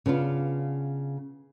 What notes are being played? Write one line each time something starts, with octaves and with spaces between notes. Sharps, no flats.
C#3 B3 D4 F4